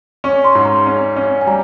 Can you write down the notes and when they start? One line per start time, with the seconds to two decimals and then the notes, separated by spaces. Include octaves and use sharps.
0.24 C#4 C#6
0.44 C6
0.55 G#2
0.65 A#5
0.86 C#4
1.16 C#4
1.41 G#5
1.47 G3 A#5